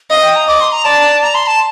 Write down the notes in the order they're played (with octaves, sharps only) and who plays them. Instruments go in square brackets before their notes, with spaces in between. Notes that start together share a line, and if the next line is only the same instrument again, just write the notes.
[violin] D#5 [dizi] F5
[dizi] G5
A#5
[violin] D#5 [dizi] D6
[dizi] C6
A#5
[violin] D5 [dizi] A5
[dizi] A#5
C6
A5